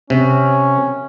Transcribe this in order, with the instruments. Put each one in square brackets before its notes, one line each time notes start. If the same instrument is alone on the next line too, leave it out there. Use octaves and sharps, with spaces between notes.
[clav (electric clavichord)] C3 [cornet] C#4